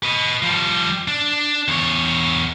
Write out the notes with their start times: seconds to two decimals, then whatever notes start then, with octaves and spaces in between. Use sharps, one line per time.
0.03 B4 D#5
0.43 F3 G3
1.08 D4
1.68 E2 C#5